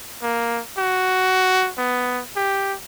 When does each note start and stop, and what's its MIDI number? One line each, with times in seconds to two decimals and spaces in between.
0.22 0.61 58
0.78 1.70 66
1.78 2.22 59
2.36 2.74 67